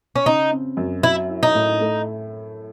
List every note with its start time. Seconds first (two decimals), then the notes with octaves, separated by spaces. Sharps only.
0.16 C#4
0.26 C#3 D#4
0.51 C4
0.77 F#2
1.03 F#3 E4
1.29 E4
1.43 D#4
1.55 A2
1.81 A3